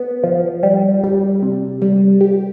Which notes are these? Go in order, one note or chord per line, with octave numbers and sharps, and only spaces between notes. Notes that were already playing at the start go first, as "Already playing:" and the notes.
Already playing: B3
F3
G3
G3
C3
G3
G4